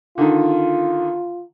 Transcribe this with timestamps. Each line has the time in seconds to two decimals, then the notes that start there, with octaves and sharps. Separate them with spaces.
0.18 D3 D#3 F4